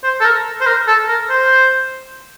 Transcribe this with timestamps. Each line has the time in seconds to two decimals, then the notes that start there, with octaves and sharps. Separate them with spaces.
0.04 C5
0.20 A4
0.24 A#4
0.61 C5
0.66 A#4
0.87 A4
1.09 A#4
1.30 C5